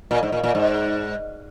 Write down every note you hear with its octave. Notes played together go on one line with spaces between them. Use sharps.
A#2
G#2
A#2
A#2
G#2